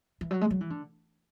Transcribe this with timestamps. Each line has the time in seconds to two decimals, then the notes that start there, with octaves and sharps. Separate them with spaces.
0.21 E3
0.31 F#3
0.41 G#3
0.51 F#3
0.61 E3
0.70 D3